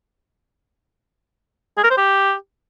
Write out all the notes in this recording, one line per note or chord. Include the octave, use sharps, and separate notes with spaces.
G#4
A#4
C5
G4